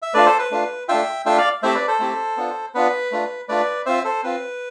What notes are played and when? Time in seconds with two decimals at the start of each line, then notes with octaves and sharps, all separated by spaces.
0.02 E5
0.14 A3 D4 F4 B4 D5
0.26 A4 C5
0.39 B4
0.51 A3 D4 F4
0.88 A3 D4 F4 E5 G5
1.25 A3 D4 F4 E5 G5
1.38 D5 F5
1.63 A3 C4 E4 G4 C5 E5
1.75 B4 D5
1.88 A4 C5
2.00 A3 C4 E4 G4
2.37 B3 D4 F4
2.74 B3 D4 F4 B4
3.12 A3 D4 F4
3.48 A3 D4 F4 B4 D5
3.86 C4 F4 C5 E5
4.04 A4 C5
4.23 C4 F4 B4